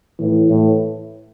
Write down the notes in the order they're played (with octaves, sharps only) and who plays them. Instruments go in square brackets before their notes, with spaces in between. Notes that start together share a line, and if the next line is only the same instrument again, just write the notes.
[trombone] A2 [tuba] E3
[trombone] A2